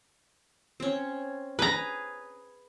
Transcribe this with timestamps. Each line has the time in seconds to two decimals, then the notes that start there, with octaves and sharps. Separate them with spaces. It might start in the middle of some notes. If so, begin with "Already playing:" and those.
0.80 C4 C#4
1.59 G#4 B4 A#5